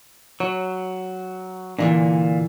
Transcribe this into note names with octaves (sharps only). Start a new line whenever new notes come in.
F#3 C#5
A#2 D3 E3 D4